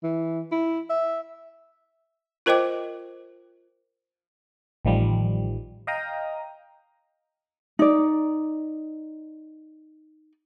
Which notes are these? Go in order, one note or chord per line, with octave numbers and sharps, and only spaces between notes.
E3
E4
E5
F4 A#4 C5 D#5 G5 D6
A1 D#3 F3 G3
D#5 F5 G5 A#5 D#6
D#4 D5